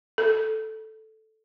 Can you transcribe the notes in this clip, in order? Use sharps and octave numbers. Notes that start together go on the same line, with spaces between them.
A4